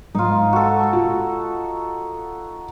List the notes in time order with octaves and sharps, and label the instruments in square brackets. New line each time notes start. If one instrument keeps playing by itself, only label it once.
[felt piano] G#2 [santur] D#4 F4
[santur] F#4 A4
[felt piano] F4